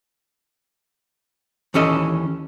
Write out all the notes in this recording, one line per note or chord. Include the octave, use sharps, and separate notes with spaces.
D#2 E3 C#4 A4 D#5